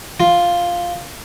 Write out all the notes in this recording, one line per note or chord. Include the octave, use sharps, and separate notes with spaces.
F4